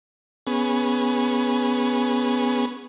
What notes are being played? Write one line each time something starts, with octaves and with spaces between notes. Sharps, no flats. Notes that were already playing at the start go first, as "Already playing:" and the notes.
B3 C#4 G#4